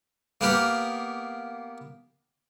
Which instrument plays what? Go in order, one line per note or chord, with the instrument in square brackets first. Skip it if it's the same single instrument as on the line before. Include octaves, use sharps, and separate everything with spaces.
[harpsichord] A#3 B3 G4 A#4